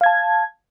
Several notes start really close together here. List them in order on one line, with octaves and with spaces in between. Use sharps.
F5 G#6 A5